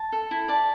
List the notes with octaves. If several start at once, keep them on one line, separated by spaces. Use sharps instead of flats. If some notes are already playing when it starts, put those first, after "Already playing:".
Already playing: A5
A4
E4
D5 A5